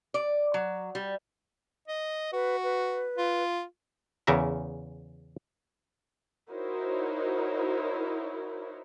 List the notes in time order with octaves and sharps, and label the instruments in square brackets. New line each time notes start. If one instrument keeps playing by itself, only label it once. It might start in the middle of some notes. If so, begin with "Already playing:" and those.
[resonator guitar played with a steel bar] D5
F#3
G3
[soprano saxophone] D#5
[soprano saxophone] F#4 [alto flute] B4
[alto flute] B4
[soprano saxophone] F4
[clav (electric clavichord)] E2 C#3 A#4 E5 A#5
[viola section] D#4 E4 F#4 A#4 C5 C#5